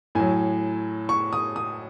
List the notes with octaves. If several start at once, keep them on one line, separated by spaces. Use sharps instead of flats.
A2 F#3 G#5
C#6
D#6
D#6